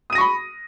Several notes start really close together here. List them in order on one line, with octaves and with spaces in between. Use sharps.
D#6 D#7 A#6 C#6 B5